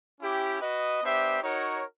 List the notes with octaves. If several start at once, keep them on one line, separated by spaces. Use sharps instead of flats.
C#4 E4 G4
F#4 B4 D#5
B3 D4 G4 C5 E5
D#4 F#4 A#4 C#5